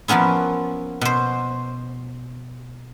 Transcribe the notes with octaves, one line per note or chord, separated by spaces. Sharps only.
F3 A#3 B3 C#4 E4
B2 C5